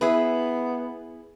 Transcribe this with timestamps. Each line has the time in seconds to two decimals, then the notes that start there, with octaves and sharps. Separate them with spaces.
0.01 B3 E4 G#4 B4